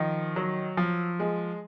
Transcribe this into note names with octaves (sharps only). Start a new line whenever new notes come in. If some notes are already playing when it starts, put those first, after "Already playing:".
Already playing: D#3 F3
F#3
F3
G#3